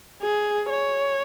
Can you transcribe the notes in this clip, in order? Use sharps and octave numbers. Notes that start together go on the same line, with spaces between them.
G#4
C#5